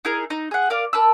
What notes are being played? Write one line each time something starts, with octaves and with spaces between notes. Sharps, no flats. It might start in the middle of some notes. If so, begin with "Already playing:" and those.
D#4 E4 G#4 A#4
D#4
G#4 F#5
A#4 D5 F5
A#4 A5 B5 E6